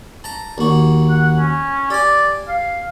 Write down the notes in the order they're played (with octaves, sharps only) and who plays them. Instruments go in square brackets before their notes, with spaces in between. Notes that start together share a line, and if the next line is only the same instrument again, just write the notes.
[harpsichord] A5 A#5
D#2 F#4
[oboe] F#5
C#4
[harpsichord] G4 G#5 [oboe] D5
[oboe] F5